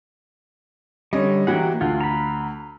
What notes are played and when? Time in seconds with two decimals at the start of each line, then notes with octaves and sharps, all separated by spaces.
1.13 D3 G3 C#4 D#5
1.47 E3 F#3 A#3 G4 F#5
1.81 D2 F4
2.01 A#5 B5